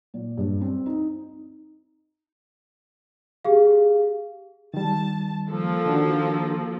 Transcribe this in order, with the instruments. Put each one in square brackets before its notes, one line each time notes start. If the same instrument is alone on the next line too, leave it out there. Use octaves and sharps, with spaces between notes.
[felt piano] A#2
G2
C4
D#4
[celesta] G4 G#4 F5
[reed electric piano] D#3 G3 [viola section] A5
[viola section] F3 A#3 A4
[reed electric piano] D#3 D4 F#4